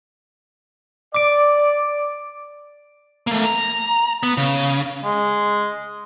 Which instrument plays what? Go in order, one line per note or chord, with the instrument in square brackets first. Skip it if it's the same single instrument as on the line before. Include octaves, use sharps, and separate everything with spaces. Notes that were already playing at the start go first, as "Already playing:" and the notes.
[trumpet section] D5 [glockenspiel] D6 D7
[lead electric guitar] A3 A#3
A#5
B3
C#3
[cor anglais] G#3